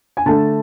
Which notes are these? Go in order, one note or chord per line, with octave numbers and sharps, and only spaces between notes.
G#5
D3 A3 A5